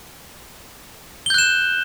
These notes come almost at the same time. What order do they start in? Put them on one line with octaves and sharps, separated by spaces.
G7 G6 F#6 E7